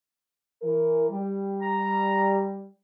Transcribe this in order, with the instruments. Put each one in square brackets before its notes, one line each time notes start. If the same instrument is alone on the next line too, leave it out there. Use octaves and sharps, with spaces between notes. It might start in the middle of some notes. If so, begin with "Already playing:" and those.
[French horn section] E3 A#4
G3
[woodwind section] A#5